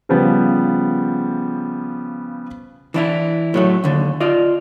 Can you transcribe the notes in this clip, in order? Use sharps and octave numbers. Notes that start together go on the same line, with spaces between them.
C#3 F3 G3 B3
E3 D4 E4
A2 F#3 A3
D#2 D3
F4 D5 D#5